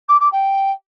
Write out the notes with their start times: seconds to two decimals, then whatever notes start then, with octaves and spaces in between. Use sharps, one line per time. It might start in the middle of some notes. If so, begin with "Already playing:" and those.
0.08 D6
0.20 D6
0.32 G5